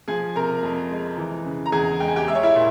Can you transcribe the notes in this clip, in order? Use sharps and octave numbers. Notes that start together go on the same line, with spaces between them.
F3 G#4 G#5
C3 A#4 A#5
F2
G#3
E3
C#3
A#5
E2 G#4 G#5
G#3 G5
G#5
G4 G5
G#3 E5
C#5
E4 E5
A#2